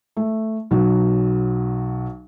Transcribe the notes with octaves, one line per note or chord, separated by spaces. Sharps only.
A3
B1 F#3